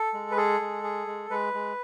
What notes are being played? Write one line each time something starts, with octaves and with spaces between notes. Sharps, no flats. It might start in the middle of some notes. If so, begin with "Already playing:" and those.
Already playing: A4
G#3
B4
G#4 A4
G#3
G#4
G#3
G#3 B4
G#3